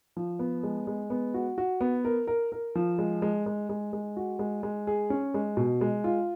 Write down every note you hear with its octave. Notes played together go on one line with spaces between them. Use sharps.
F3
B3
G#3
G#3
B3
F#4
F#4
B3
A#4
A#4
A#4
F3
G#3
G#3
G#3
G#3
G#3
F#4
G#3
G#3
G#4
C#4
G#3
B2
G#3
F4